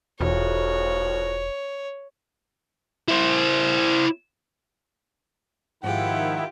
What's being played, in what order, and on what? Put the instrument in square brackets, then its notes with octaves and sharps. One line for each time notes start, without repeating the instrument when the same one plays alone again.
[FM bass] E1 [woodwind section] C2 F2 F#4 [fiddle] C#5
[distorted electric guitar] E4 C5
[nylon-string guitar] G#2 F3 G#3 [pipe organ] D#3 E4 [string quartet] F4 G4 [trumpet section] F#5